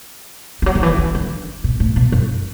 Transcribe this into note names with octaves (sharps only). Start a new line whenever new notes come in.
E3
F#3
D3
E3
D3
D3
B2
A2
B2
F#2